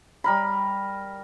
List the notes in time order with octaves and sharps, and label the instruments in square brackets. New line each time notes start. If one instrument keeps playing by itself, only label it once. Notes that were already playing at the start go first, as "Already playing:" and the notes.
[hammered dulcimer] G3 A#4 B5